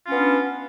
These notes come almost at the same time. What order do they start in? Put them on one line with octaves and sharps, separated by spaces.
F4 C#4 B3 D4